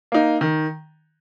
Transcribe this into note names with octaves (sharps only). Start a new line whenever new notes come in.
A#3 D#4
D#3